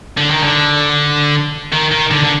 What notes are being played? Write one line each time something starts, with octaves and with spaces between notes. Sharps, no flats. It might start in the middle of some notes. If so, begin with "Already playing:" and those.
D3
D#3
D3
D#3
D#3
D3
D3